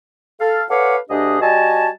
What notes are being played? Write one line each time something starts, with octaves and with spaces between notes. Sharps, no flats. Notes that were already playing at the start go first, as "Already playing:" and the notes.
A4 F5
A4 B4 C#5 D5 F5 F#5
D2 D4 G4 G#4 D#5
G3 F#4 D#5 G#5 A5